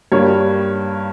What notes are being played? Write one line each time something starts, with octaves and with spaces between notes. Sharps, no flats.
G2 G3 A#3 C#5